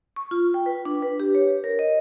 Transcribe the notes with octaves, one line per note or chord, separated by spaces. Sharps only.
C#6
F4
G5
B4
D4
B4
G4
C#5
A#4
D#5